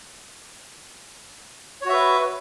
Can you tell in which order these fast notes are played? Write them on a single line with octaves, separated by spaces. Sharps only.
C#5 F#4 E5 B4